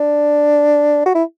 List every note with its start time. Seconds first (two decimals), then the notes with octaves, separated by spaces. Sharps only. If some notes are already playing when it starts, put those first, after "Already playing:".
Already playing: D4
1.06 F#4
1.15 E4